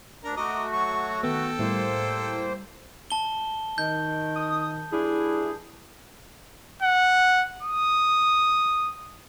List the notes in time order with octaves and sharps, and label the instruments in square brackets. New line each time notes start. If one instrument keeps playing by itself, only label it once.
[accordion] D2 D4 [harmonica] A#4
[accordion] A3 F#4 [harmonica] D#5 A#5 D6
[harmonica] F#3 C#6
[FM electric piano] D#3 B3 [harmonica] A4 G5
[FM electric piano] A2 G3 E4 [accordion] A#3 C5
[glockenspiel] A5 G7
[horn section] D#3 [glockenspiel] G6
[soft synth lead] D#6
[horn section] G2 D4 G#4 [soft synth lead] E4
[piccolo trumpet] F#5
D#6